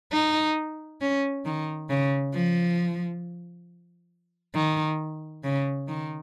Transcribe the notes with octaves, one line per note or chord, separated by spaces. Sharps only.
D#4
C#4
D#3
C#3
F3
D#3
C#3
D#3